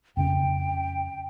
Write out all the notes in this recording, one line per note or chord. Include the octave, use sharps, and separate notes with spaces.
F2 C#3 C#4 G5